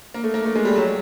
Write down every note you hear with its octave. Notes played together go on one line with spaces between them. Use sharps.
A#3
A3
A#3
A3
G#3
G3
F#3